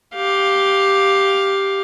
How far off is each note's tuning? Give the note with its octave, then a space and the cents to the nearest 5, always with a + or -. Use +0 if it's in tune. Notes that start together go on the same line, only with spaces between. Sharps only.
G4 +0 F5 +10